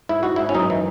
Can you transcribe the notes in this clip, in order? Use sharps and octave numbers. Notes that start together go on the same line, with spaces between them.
G#2 E4
G#2 F#4
E4
G#2
C#4
F#2 D#4
E3